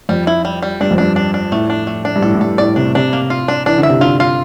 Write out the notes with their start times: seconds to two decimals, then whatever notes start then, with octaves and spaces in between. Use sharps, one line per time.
0.09 F2 G3
0.27 E4
0.45 G3
0.62 G3
0.81 G2 D4
0.91 F2
0.98 G2 D4
1.16 D4
1.34 D4
1.52 A2 A3
1.70 D4
1.87 A3
2.05 D4
2.16 G2
2.22 A2 A4
2.34 A2
2.41 G2 A4
2.58 A2 D5
2.76 C3 D4
2.95 C3 D4
3.13 A#3
3.30 F4
3.48 D4
3.66 E3 D4
3.78 D3
3.83 E5
3.89 C3
4.00 D3 F4
4.20 F4